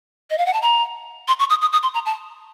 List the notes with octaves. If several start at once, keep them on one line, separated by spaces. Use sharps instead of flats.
D#5
F5
F#5
A5
A#5
C6
C#6
D#6
D#6
D#6
C6
A#5
A5